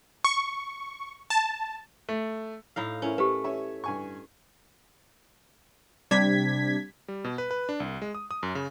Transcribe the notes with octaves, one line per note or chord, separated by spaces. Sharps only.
C#6
A5
A3
A2 D#4 F5
C#4 E4 A#4
A3 G4 B4
C#4 C#5 E5
G2 G#5 C#6
C3 G3 D4 G#6 B6
G3
B2
B4
B4
D4
C2
G#3
D#6
D#6
F#2
C#3